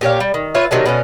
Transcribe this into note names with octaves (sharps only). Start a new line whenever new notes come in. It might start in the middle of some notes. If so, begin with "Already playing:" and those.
A#2 G4 C#5 F5
G3
D#3
F4 B4 C#5 E5
C3 D#3 F#3 D4
B2 D3 C#4